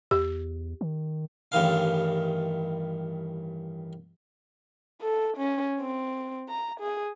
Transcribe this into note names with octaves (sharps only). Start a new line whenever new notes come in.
E2 G4
D#3
A1 G2 D#3 F5
A4
C#4
C4
A#5
G#4